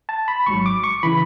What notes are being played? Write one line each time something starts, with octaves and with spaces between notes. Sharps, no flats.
A5
B5
G#1 G#2 F#3 C#6
D6
C#6
C#3 E3 B5